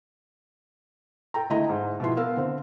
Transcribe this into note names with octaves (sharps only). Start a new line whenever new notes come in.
A4 G5 A#5
D3 A3 E4 D#5 A#5
G#2
B2 F3 B3 E4 C6
B3 A#4 F5 E6
D3 C4